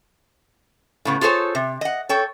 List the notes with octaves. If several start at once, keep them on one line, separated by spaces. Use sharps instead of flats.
A2 C#3 B3
F4 G#4 A4 C5 C#5 A5
C3
D#5 F#5
A4 C#5 G5